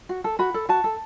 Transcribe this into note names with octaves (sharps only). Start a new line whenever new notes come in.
F#4
A4
F#4 B5
A4
F#4 A5
A4